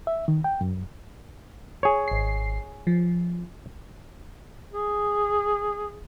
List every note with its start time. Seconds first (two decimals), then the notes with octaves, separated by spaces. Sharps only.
0.07 E5
0.28 D#3
0.44 G5
0.61 F#2
1.83 G#4 C#5
2.08 G#1 C7
2.87 F3
4.73 G#4